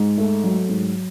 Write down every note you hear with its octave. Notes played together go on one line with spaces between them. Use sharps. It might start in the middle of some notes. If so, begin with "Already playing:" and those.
Already playing: G#2
A3
F#3
G#2